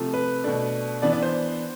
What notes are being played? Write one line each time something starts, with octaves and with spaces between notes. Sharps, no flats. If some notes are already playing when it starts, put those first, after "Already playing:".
Already playing: C3 F3 A3
B4
B2 A3 D4
E3 B3 D4 D5
D5
C5